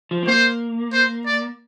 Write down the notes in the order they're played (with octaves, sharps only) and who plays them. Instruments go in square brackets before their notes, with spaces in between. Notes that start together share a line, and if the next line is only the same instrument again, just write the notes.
[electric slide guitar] F3
C4
[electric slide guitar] A#3 [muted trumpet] C5
[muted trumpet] C5
D5